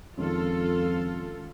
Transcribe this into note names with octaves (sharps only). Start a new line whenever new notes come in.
F2 D#3 G#3 C#4 F4 A4